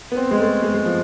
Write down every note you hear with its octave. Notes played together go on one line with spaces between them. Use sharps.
B3
C4
G#3
A3
G#3
G#3
F3